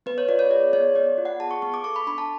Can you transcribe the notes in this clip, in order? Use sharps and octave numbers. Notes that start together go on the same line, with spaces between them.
B3 B4
C#5
F4 D5
C#5
G#4 D5
B3 C#5
B3 D5
F4
F#5
G#4 A5
C#6
B3 C#6
D6
A4 C#6
B5
D4 B5
A5